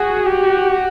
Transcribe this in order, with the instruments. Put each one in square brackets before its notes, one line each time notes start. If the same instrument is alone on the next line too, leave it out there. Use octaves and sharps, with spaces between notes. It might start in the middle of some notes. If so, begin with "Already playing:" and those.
Already playing: [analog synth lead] F#4 [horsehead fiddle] G#4
[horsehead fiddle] G4